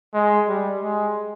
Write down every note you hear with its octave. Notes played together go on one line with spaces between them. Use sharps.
G#3
G3
G#3